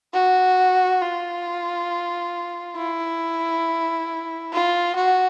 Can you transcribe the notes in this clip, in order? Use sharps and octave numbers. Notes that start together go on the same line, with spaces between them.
F#4
F4
E4
F4
F#4